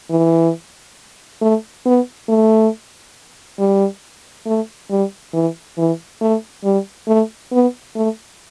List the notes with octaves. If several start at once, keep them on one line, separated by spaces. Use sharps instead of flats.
E3
A3
B3
A3
G3
A3
G3
E3
E3
A3
G3
A3
B3
A3